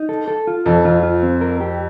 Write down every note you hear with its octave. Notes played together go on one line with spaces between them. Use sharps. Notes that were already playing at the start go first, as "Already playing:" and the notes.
Already playing: D#4
A4
A4
F4
F2 A4
F2 F4
F4
C4
A#4
G4